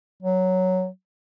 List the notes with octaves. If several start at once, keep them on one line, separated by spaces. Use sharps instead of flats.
F#3